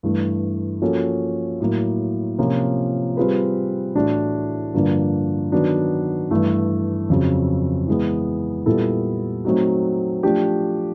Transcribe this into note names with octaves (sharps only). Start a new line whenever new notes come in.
G2 E3 A3
F3 A#3 C#4 F#4 A4
A2 F#3 A#3
C3 F3 A#3 C#4 F4
G3 C4 F4 G#4 B4
A2 E3 A3 D4 F#4
G2 D3 F3 A#3 D4
D#3 F#3 B3 D4 F#4
G2 E3 A3
F2 C#3 F#3
E3 G#3 B3
A#2 G3 B3 E4 A4
F#3 A3 C4 D#4 F#4
F3 A3 D4 G4